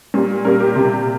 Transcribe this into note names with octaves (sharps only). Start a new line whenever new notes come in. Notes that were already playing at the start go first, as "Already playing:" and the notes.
A#2 G3 A#3
A#2 G3 A#3 A#4
G4
C3 G3 A#3